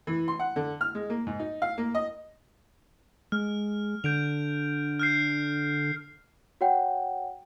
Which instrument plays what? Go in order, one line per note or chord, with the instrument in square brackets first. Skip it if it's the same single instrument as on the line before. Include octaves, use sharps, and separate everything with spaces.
[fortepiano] E3
C6
F#5
D3
F6
G#3
A#3
G#2
D#4
F5
A#3
D#5
[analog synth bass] G#3 [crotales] F6
[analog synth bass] D3 [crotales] G6 D7 F7
[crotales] F6 G6 C7
[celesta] F#4 C#5 F#5 G5